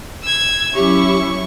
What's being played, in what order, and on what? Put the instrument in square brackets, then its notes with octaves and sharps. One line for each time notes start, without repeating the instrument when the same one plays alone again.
[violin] E6 G#6
[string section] F#3 C#4 E4 [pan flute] G4 [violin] C#6